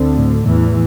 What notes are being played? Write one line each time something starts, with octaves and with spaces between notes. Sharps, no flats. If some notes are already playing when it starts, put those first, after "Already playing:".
Already playing: D2 D3 C4
A2
E2 A2 E3